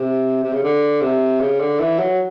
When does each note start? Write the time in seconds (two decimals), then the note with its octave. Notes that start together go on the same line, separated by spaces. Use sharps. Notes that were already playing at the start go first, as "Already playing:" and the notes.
Already playing: C3
0.43 C3
0.53 C#3
0.63 D3
1.01 C3
1.40 C#3
1.60 D3
1.79 E3
1.99 F#3